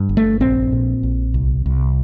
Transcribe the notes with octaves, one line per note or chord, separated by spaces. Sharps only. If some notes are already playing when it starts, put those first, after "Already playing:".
Already playing: G2
G1
A3
A#1 C4
A#2
A#1
C2
C2